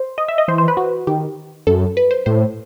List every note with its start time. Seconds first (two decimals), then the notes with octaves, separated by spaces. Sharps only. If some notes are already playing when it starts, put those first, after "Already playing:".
Already playing: C5
0.18 D#5
0.28 E5
0.38 D#5
0.48 E3 C5
0.58 C5
0.68 B4
0.77 F#4
1.07 D#3 G4
1.67 F#2 A4
1.97 B4
2.11 C5
2.26 A2 C5